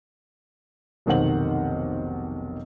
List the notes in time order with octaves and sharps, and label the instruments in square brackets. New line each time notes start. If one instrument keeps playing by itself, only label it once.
[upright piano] F1 B1 D#3 C5 F#5 F#7